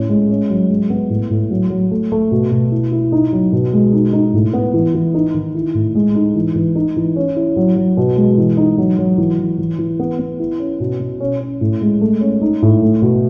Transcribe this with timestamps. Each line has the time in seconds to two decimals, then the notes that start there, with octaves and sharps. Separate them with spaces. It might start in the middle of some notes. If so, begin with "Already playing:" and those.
Already playing: A2 C#4
0.09 G#3
0.29 C#4
0.50 F#3
0.70 G#3
0.90 B3
1.10 A2
1.30 A2
1.50 F#3
1.70 F#3
1.91 A3
2.12 A3
2.31 B2
2.51 B2
2.72 E4
2.92 E4
3.12 D#4
3.33 F#3
3.52 B2
3.73 G#3
3.93 D#4
4.13 D#4
4.33 A2
4.53 B3
4.74 E3
4.94 E3
5.14 D#4
5.34 D#3
5.55 E4
5.74 A2
5.95 G#3
6.15 D#4
6.35 E3
6.55 E3
6.75 D#4
6.97 E3
7.16 C#4
7.36 E4
7.57 F#3
7.76 F#3
7.97 B2
8.17 G#3
8.38 E3
8.57 D#4
8.78 F#3
8.99 F#3
9.18 E3
9.39 E3
9.58 E3
9.79 E3
10.00 B3
10.19 B3
10.40 E4
10.59 C#4
10.80 B2
11.00 B2
11.20 C#4
11.40 C#4
11.61 A2
11.81 G#3
12.01 A3
12.21 C#4
12.42 D#4
12.62 A2
12.83 A3
13.02 B2